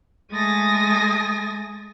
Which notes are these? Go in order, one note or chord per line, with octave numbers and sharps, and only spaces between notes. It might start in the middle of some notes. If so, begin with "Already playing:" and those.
G#3 A3 G#5 D#6 A6 A#6